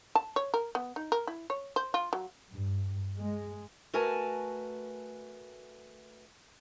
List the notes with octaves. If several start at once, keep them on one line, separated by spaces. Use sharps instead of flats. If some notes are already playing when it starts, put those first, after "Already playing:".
A5
C#5
A#4
B3
D#4
A#4
E4
C#5
C5
F4
F#3
G2
G#3
A3 F#4 A#4 B4 G#5 A5